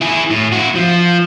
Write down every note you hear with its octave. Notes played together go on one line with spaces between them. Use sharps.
E4 G#4
A2
E4 F#4
F3